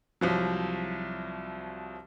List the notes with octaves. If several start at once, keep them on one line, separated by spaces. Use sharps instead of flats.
C2 F3 F#3